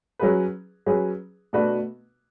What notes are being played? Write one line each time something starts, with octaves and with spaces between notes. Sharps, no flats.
F#3 C#4 G#4 B4
F#3 C#4 G#4 B4
B2 A3 D4 F#4 B4